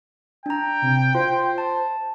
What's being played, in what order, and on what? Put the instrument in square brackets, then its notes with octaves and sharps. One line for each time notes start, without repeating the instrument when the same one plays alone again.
[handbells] D4 A#5 [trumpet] G5
[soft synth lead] C3
[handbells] F4 [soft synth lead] C5
[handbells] A5